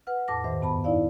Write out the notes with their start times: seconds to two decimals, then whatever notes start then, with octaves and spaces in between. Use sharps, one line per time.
0.07 B4 F#5 F6
0.28 E2 A2 A5 D6 A#6
0.44 G2 D#3 C5 E5
0.62 F#2 B3 A5 B5
0.84 D#4 E4 D5 F5